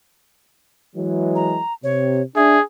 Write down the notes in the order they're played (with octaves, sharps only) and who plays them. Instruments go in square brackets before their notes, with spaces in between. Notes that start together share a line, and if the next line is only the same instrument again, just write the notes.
[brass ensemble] E3 F#3 G#3
[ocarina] A#5
[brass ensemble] C3 [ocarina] C#5
[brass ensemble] D4 [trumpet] G#4 [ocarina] E5